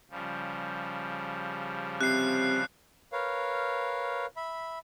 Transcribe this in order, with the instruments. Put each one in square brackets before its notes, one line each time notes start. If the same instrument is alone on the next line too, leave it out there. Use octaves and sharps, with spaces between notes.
[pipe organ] C#3 F3 G3
[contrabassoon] C3 [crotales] F#6 C7
[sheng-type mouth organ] A#4 B4 C#5 F5
E5 B5